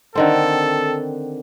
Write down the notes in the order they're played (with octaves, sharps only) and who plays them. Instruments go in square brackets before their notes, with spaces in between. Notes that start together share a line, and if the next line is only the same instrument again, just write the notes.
[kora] D3 D#3 C4 [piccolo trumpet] A4